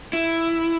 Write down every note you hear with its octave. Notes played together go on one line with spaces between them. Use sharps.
E4